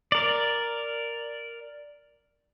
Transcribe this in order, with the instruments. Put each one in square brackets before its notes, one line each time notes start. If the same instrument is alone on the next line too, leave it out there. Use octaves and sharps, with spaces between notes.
[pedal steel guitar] A#4 D5